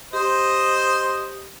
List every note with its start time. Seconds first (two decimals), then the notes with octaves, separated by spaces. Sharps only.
0.13 G4 C5 D#5 D#6